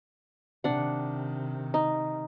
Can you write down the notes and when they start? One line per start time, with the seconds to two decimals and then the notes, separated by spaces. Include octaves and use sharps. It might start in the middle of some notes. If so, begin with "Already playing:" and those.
0.64 C3 D#3 D4 F#5
1.74 D#4